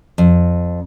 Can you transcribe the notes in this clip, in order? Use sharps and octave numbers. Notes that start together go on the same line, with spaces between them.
F2